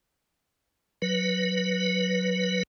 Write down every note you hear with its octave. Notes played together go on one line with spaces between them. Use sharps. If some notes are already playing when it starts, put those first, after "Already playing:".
F#3 B4